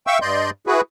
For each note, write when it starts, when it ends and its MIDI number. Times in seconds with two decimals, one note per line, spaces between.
0.07 0.19 76
0.07 0.19 77
0.07 0.19 79
0.07 0.19 85
0.07 0.19 88
0.22 0.50 43
0.22 0.50 74
0.22 0.50 75
0.22 0.50 84
0.22 0.50 91
0.67 0.81 64
0.67 0.81 66
0.67 0.81 68
0.67 0.81 71